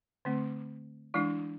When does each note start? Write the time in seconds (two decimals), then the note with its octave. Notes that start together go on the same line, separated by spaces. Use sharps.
0.25 D3 A3 C4
1.14 E3 G#3 D4 E4